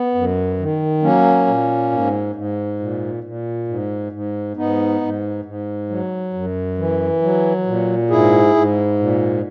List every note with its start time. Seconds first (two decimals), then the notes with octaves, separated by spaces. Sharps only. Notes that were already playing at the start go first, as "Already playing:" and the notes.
Already playing: B3
0.15 F#2
0.59 D#3
1.03 F#3 A#3 C#4
1.47 A#2
1.92 G#2
2.35 G#2
2.80 A#2
3.24 A#2
3.68 G#2
4.12 G#2
4.56 G#2 B3 D#4
5.01 G#2
5.45 G#2
5.89 F#3
6.34 F#2
6.78 E3
7.22 F#3
7.66 A#2
8.10 G#2 E4 G#4
8.55 G#2
8.99 A#2